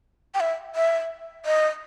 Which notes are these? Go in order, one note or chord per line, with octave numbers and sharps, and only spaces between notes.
G5
E5
E5
D#5